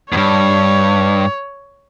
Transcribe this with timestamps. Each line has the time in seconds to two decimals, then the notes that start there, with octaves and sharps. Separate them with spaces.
0.12 E2 G2 C#5